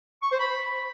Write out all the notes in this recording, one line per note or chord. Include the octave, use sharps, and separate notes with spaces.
C#6
C5
B5